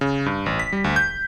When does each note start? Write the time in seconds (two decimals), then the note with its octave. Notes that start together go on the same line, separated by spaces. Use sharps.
0.01 C#3
0.26 G2
0.46 A1
0.60 B6
0.73 G3
0.84 D2
0.96 G6